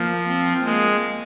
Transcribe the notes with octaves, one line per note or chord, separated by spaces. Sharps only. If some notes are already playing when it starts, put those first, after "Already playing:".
Already playing: F3 A#3
C4
G#3 A#3